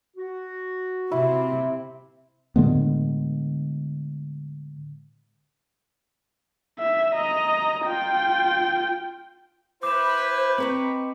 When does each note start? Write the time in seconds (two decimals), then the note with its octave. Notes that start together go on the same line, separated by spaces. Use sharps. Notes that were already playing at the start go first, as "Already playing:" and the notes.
0.17 F#4
1.12 C3 C4 E4
2.56 A2 D3 G#3 B3
6.79 E5
7.15 D#5 A#5
7.86 F4 G5
9.83 E4 B4 C5 D6 E7
10.58 C4 B4 D#5 A#5 B5 C#6 F#7